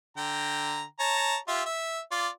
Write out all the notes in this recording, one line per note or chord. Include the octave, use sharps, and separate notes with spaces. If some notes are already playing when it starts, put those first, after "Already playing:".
D3 G5 A#5
C#5 A5 A#5
F4 G4 E5
E5
F4 D5